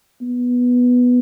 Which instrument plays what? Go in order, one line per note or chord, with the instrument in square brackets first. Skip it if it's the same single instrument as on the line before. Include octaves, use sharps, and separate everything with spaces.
[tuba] B3